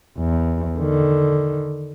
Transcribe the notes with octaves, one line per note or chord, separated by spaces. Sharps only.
E2
D3 D#3